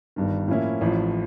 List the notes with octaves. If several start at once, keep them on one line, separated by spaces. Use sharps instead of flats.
G1 G2 D#3
A2 F3 A#3 C#4 E4
A1 A2 F3